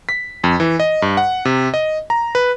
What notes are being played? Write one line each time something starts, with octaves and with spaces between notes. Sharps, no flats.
B6
F2
E3
D#5
G2
F#5
C3
D#5
A#5
B4